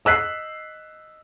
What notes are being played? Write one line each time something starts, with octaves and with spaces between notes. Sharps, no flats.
D#5 E6 F#6 B6 C7